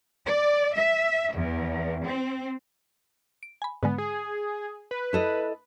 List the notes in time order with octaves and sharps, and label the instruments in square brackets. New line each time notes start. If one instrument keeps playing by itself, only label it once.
[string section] D5
E5
E2
C4
[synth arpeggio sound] D7
G#5 B5
[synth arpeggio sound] G#2 D3 G#3 [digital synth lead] B3
[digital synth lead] G#4
B4
[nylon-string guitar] E4 A4 D#5